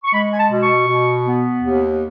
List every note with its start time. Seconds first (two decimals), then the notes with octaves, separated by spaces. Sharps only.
0.04 C#6
0.12 G#3 B5
0.33 G#5
0.38 A5
0.50 B2
0.62 C#6
0.87 B2
1.26 B3
1.62 D#2